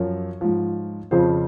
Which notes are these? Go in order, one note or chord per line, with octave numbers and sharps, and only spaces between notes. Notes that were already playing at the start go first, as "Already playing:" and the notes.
Already playing: F#2 F3 C#5
G#2 F3
F2 C#3 F3 C5